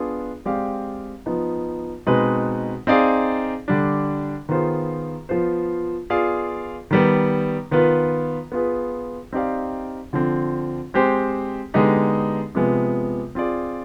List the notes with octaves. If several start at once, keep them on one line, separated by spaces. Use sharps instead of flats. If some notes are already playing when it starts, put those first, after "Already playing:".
Already playing: B3 D4 F4 G#4
G#3 C4 G4 D5 F5
F3 B3 D#4
B2 G#3 C4 D#4 B4
C4 D#4 G#4 D5 F5
D3 G3 D4
D#3 B3 F4 G#4 C5
F3 B3 F4 C5
B3 F4 G#4 D5 F5
D#3 G3 B3
D#3 B3 F4 B4
B3 F4 G#4 B4
C4 D#4 G4 D5 F5
D3 F3 C4
G#3 C4 G4 C5
D3 G#3 B3 D#4 G4
C3 F3 G#3 B3
C4 F4 G#4 D5